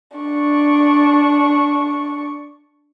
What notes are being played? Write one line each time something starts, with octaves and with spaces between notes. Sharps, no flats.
D4 C#6